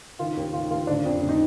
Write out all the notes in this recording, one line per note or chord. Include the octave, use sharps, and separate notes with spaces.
D#3 F4
D#2
D#3 F4
D#2 F4
D3 D4
F2
D3
D#4